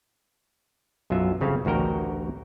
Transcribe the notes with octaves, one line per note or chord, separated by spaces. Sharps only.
B1 F#2 F#3 F4 E5
G1 C#3 C4 C#4 A4 F5
A1 D2 F#4 A#4 G5